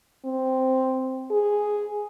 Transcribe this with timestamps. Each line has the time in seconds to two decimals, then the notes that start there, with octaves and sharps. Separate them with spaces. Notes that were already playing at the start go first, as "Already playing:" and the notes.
0.25 C4
1.31 G#4